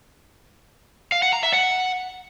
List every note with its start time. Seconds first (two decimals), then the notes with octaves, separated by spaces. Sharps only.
1.12 F5
1.22 F#5
1.33 A#5
1.43 E5
1.53 F#5